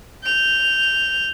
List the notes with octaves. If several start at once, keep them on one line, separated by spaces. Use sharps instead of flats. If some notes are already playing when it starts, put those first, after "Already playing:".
G6 F7